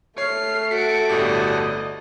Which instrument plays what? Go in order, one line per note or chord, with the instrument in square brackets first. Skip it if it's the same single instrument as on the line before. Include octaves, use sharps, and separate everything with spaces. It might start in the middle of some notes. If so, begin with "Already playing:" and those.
[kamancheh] A3 [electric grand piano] C#5 [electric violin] F6 C7
[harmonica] F#4 A4 [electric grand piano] B6 [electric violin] C#7 D7
[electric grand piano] G1 A2 G4 [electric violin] D5 D#5